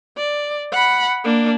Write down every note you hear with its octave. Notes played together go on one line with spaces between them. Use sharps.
D5
F#5 B5
A#3 D4